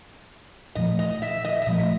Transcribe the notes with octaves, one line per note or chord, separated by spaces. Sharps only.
A#2 F3 A3 D#5
D#5
E5
D#5
E5
A#2 F3 A3 D#5